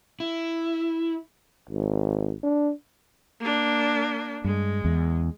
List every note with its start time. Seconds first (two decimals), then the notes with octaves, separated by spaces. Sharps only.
0.20 E4
1.69 G#1
2.43 D4
3.40 A#3 D4
4.44 G2 G#3
4.85 E2